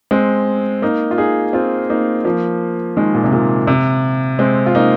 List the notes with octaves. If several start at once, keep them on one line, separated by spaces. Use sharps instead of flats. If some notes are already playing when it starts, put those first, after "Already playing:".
G#3 C4
A#3 D#4
F4
D#4 G#4
C4 F4
A#3 D#4
F3 A#3
D#3 G#3
A#2
C3
A#2 D#3
C3
G#3 C4
F4
A#3 D#4